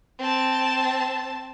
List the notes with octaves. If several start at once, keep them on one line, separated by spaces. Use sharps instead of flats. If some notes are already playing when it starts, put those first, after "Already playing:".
C4 A5